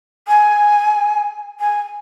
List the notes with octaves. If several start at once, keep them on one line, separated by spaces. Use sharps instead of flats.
G#5
G#5